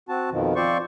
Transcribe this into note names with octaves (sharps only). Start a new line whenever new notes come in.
C4 F#4 A5
F2 B2 D#3 F3
F3 C4 C5 D5 C#6